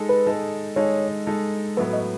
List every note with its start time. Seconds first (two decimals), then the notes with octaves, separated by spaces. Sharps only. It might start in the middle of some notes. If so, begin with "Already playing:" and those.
Already playing: G#3 D#4 A4
0.09 B4
0.26 G#3 D#4 A4
0.76 G#3 D#4 A4 C#5
1.27 G#3 D#4 A4
1.77 A2 F#3 B3 B4
1.93 D#5